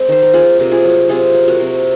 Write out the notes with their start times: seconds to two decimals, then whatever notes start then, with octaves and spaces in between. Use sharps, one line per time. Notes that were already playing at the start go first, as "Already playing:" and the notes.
Already playing: G#3 C4
0.09 D#3 C5
0.23 A#4
0.34 A#3 F4 G#4
0.59 C3 A#4
0.72 F4 G#4
0.84 F#3
1.09 C3 F4 G#4
1.35 A#3
1.48 F#4 A#4
1.60 C3